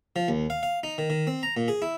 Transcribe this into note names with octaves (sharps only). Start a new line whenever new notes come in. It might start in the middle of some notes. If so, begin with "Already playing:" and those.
F3
D#2
F5
F5
D#4
D#3
D#3
C4
A#5
A#2
G#4
E4